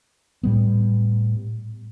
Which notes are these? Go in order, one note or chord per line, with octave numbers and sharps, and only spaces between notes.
A2 G3 B3